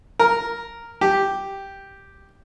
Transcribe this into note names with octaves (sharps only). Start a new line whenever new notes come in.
A#4
G4